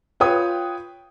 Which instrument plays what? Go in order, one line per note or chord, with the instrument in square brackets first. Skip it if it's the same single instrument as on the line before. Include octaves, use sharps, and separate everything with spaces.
[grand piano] F4 B4 C#5 G5 D#6